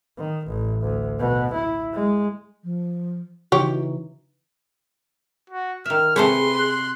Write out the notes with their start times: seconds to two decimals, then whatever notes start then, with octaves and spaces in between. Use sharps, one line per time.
0.18 D#3
0.47 A1
0.82 D2
1.19 B2
1.54 E4
1.94 G#3
2.64 F3
3.52 C#3 E3 D#4 F#4 G4 C#5
5.50 F#4
5.86 D#3 E5 F6
6.16 C3 A3 G#4 B4 C#5 C6
6.58 F#6